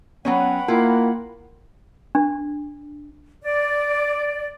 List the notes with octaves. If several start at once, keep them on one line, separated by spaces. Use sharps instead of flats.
F#3 B3 C#4 F#5 G5 B5
A#3 E4 F4
D4
D5